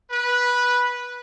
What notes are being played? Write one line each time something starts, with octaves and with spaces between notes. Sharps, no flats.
B4